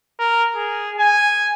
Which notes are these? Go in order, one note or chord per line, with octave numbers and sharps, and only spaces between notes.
A#4
G#4
G#5